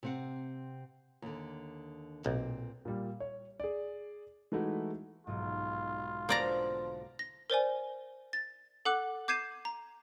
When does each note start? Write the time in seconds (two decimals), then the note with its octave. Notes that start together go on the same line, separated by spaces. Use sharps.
0.03 C3 C4 F#5
1.22 D#2 D3
2.26 B1 A#2 C4
2.85 A#2 G3
3.20 C#5
3.60 G#4 D5
4.52 E3 G#3 A3 D#4 E4 F#4
5.27 B1 G#2 F4
6.29 D3 F3 A#3 B3 D5 A#5
7.19 A#6
7.50 A#4 C5 D5 G#5
8.33 A6
8.85 A4 F#5 D6 F#6
9.28 D6 G6 G#6 C7 D#7 E7
9.65 A#5